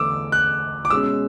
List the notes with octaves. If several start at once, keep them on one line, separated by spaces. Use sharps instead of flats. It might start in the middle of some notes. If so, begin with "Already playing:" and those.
Already playing: E2 D3 A3 D6 E6
F#6
D6
B2 G#3 C#4 E6